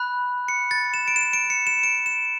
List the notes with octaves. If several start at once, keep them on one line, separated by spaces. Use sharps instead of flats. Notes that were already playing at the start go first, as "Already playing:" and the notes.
Already playing: B5 F#6
C#7
A6
E7
D7
E7
D7
C#7
E7
D7
E7